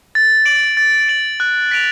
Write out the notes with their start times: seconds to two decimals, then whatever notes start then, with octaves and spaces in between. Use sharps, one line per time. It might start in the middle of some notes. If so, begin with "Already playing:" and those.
0.15 A6
0.46 D7 F#7
0.77 A6
1.08 D7 F#7
1.40 F#6
1.71 B6 D7 F7